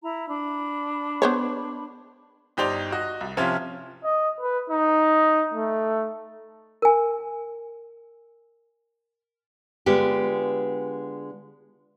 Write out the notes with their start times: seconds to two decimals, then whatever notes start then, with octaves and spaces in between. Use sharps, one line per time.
0.03 E4 A#5
0.27 D4 B5
1.22 B3 C5 C#5
2.57 G1 D#4 G4 C5 D5 F7
2.92 F#4 D#5
3.21 C2
3.37 C3 F3 C4 C#4 E4 F4
4.04 D#5
4.41 B4
4.70 D#4
5.54 A3
6.82 A#4 G#5
9.86 D3 G#3 B3 F4 G4